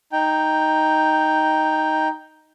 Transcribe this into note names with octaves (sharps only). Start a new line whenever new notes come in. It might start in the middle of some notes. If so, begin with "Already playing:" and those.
D#4 G5